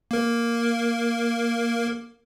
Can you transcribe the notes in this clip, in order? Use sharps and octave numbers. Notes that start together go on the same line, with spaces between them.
A#3 A#4